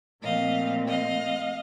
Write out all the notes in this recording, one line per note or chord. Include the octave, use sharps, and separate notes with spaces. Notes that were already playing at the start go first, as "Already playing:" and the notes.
A#2 F3 A3 C4 D#5 F5
D#5 F5